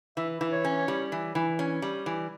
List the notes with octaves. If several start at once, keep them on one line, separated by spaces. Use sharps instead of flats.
E3 E5
E3
C#5
C#4
G3
E3
E3
C#4
G3
E3